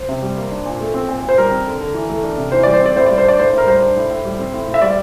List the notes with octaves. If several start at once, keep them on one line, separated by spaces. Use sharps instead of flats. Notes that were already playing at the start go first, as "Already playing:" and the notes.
Already playing: C5
C3
G3
A#3
D4
A#2
A3
C4
A#2
A#2
C5
G3 A#4
C4
D3
D3
E3
A3
D4
C3
E3 C5
G3 D5
C5
C4
D5
A2 C5
G3 D5
C5
D4 D5
A2 C5
A2 A#4
G3 C5
D4
A2
A2
G3
C4
A2
A2
E5
G3 D5